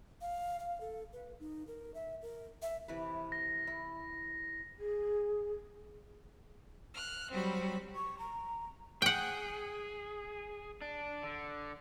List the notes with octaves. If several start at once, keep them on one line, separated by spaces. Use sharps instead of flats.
F5
F5
A4
B4
D#4
A#4
E5
A#4
E5
C3 E3 B4
A#6
E4
G#4
F6 F#6
F#3 G3 C4 B5
C#6
A#5
G#4 F#5 G5
D4
D3